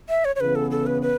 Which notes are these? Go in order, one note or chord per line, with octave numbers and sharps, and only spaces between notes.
E5
C#5
C#5
C#3 E3 B3 B4
A4
A4
B4
B4